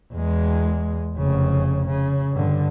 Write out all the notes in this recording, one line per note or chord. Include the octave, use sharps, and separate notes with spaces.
E2 G#3
F1 C#3
C#3
G2 D3